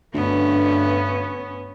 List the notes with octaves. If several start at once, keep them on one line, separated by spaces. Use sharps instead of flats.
D2 G2 B3 C#4